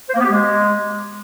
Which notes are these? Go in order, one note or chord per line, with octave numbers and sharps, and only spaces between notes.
C5
A#3
B3
G4
G#3